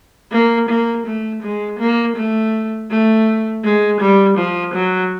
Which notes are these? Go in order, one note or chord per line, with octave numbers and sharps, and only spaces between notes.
A#3
A#3
A3
G#3
A#3
A3
A3
G#3
G3
F3
F#3